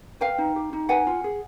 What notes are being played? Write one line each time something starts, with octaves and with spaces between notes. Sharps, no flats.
B4 F5 G5
D#4
G4
D#4
B4 F#5 G#5
F4
G#4